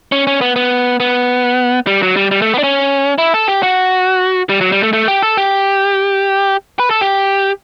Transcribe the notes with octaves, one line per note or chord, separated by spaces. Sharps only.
C#4
C#4
B3
B3
B3
G3
F#3
G3
G3
A3
B3
D4
C#4
E4
A4
G4
F#4
G3
F#3
G3
A3
A3
G4
A4
G4
B4
A4
G4